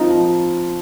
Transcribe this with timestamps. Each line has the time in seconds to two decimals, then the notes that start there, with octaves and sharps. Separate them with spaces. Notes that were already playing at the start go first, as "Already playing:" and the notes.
Already playing: F3 C4 D#4 F4
0.10 F3